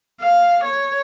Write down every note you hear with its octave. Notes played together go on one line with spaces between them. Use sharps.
F5
C#5